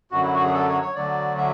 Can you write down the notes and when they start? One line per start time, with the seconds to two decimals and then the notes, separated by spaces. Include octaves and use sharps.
0.11 F#2 D3 F#3 F#4
0.22 E4
0.33 F#4
0.44 G#4
0.54 A4
0.68 C#5
0.82 C#5
0.95 D2 D3 F#3 D5
1.38 E5